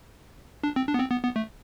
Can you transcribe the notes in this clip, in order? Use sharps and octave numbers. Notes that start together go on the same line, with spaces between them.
D4
C4
D4
B3
C4
B3
B3
A3